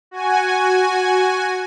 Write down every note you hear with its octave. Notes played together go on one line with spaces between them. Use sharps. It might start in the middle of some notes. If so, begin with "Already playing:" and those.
F#4 G#5